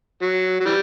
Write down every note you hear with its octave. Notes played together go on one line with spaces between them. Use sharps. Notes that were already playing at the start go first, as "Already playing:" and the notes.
F#3
F#3
E3 G3